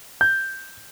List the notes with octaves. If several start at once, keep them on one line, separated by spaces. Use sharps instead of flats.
G6